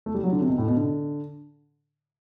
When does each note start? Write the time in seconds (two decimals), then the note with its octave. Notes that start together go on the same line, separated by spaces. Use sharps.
0.06 A3
0.15 G3
0.24 F#3
0.32 D3
0.41 C3
0.49 B2
0.58 A2
0.68 B2
0.77 D3